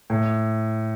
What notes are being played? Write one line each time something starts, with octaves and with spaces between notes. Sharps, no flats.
A2